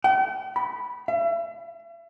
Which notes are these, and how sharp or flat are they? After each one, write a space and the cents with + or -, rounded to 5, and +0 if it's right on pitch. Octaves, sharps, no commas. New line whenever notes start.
G5 -45
B5 -5
E5 +40